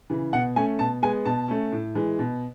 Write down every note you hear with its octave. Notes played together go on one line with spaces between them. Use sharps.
C#3 E3
B2 F#5
A3 C#4 G#5
B2 A5
G#3 B3 G#5
B2 A5
A3 C#4
A2
E3 G#3
B2